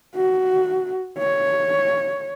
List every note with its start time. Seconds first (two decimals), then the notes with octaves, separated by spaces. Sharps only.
0.16 F#4
1.19 C#5